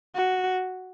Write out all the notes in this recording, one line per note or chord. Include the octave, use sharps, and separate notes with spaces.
F#4